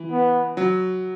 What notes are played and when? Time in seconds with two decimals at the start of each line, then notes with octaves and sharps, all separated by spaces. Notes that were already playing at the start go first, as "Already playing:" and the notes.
Already playing: E3
0.11 B3
0.57 F#3